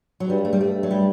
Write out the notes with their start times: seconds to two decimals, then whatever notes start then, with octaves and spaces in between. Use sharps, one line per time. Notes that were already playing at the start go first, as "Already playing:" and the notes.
0.20 F#3
0.28 G2 G3
0.45 A3
0.53 G3
0.60 G2 A3
0.83 F#3
0.91 G3